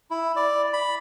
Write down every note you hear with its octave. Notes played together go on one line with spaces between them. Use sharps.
E4
D5
B5